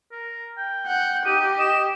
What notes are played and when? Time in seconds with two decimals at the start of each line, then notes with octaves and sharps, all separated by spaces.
0.12 A#4
0.58 G5
0.87 F#5 G6
1.25 D#4 G4 D#7
1.58 D#5 E7